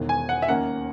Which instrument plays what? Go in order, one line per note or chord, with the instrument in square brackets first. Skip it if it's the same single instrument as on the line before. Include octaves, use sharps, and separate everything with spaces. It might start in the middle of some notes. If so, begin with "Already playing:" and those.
Already playing: [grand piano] E1 E2 D#3
G#5
F#5
E5
D#2 D#3 A#3 C#4 F#5